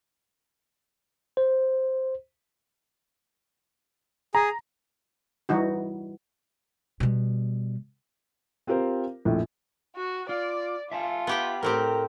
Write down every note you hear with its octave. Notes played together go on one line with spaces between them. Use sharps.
C5
G#4 A#5
E3 G3 D#4 F#4
B2 G3
C4 F4 G4 A#4 C5
A#1 F2 A2
F#4
F4 D5
F4 E5 G#5 A5
B3 G4 G5
A2 C4 G4 A#4 A#5